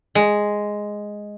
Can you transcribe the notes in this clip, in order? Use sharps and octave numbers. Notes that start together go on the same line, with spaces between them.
G#3